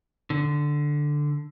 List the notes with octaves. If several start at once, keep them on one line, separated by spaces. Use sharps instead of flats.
D3